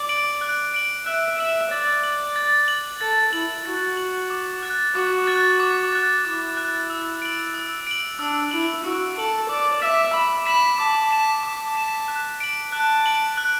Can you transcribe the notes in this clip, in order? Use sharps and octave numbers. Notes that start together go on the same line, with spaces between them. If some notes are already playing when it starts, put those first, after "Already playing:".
Already playing: D5
D7 F#7
F#6
D7 F#7
E5 F#6
E5 D7 F#7
D5 A6
F#7
A6
F#7
A4 A6
E4 F#7
F#4 A6
F#7
D6
F#6 A6
F#4 D6
F#6 A6
D6
F#6 A6
E4 D6
F#6 A6
E6
D7 F#7
E6
D7 F#7
D4 E6
E4 D7 F#7
F#4 E6
A4 D7 F#7
D5 D6
E5 B6 E7
B5 D6
B5 B6 E7
A5 D6
B6 E7
A5 D6
B6 E7
F#6
D7 F#7
A5 F#6
D7 F#7
F#6